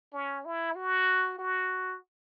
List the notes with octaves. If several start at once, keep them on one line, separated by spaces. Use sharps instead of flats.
C#4
E4
F#4
F#4